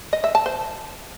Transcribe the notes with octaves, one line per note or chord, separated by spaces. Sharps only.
D#5
E5
A5
C5